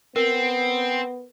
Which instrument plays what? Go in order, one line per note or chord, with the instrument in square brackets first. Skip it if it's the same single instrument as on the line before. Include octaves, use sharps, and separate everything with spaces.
[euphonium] B3 [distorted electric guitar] C4 [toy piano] A#4